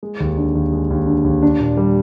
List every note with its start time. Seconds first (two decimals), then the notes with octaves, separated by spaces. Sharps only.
0.03 G#3
0.20 D#2
0.37 D3
0.55 D#2
0.72 G#3
0.90 D#2
1.07 D3
1.24 D#2
1.42 D4
1.60 A#2
1.77 G3